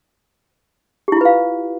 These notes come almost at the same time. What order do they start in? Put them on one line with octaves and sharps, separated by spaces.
G4 E4 F4 B4 F5